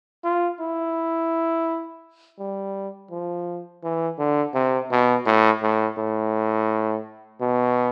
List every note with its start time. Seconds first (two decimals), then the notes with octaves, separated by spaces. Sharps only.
0.24 F4
0.60 E4
2.39 G3
3.11 F3
3.84 E3
4.18 D3
4.54 C3
4.91 B2
5.26 A2
5.62 A2
5.98 A2
7.41 B2